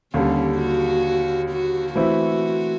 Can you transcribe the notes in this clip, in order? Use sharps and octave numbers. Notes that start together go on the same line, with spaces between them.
D#2 D3 G3 C#4
F#4
F#4
E3 A3 C4 E4 F#4